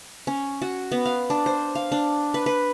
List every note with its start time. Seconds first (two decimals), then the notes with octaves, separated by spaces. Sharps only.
0.27 C#4
0.62 F#4
0.92 B3
1.05 F5
1.30 D4
1.46 C5
1.75 F5
1.92 D4
2.34 B4
2.46 B4